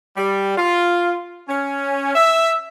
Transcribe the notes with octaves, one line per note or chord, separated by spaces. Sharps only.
G3
F4
C#4
E5